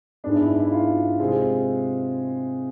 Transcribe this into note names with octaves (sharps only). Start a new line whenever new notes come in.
G#2 G#3 B3 D4
E4
E4
E4
F4
C3 G#3 C4